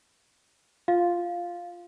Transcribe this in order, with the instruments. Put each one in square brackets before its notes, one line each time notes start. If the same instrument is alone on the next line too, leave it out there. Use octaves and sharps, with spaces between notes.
[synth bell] F4 [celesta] F5